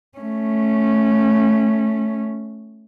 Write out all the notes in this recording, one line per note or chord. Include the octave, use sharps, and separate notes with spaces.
A3 C#4